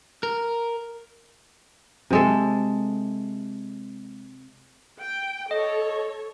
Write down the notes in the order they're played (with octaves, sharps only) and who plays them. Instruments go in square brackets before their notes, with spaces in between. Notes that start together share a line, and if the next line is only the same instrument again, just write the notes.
[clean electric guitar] A#4
[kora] C3 G#3 A4
[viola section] G5
[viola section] A4 C#5 [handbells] D#5